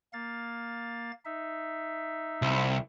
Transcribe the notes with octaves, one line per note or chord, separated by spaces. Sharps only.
A#3 F5 A6
D#4 E5
C2